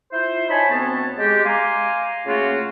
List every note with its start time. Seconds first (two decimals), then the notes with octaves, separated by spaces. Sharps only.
0.12 E4 F4 C5
0.49 D#4 C#5 G#5 A5 B5
0.71 D2 B3 C4 C#5 A5
1.19 G#3 G4
1.46 F5 G#5 A#5 C6 D6
2.26 C#3 A3 A#3 F4 F#4